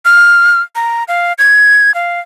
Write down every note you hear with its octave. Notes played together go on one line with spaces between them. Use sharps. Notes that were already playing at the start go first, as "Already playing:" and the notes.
F6
A#5
F5
G#6
F5